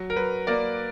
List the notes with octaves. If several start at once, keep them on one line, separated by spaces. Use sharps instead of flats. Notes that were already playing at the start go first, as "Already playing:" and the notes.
Already playing: F#3
A#4
F#3 B4
A#3 A#4 D5